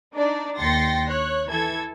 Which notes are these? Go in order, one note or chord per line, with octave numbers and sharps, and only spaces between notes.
D4 D#4 D5
D#2 G5 C6 A6 A#6 C#7
C#5 F#6
E3 A4 G#6